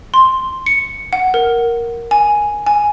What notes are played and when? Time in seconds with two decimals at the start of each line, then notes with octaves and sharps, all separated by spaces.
0.14 C6
0.66 C#7
1.13 F#5
1.34 A#4
2.11 G#5
2.66 G#5